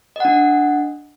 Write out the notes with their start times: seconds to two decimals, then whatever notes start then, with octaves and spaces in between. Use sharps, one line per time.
0.16 D#5
0.20 F#5
0.25 D4